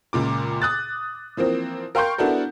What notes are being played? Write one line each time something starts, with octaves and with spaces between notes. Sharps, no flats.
C#2 A#2 D6
D#6 F#6 A6
E3 F3 A#3 C4
A#4 F5 G5 C6 C#6 G6
B3 D4 E4 F#4 A4 A#4